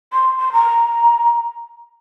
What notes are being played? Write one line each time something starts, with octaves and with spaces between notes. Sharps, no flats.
C6
C6
A#5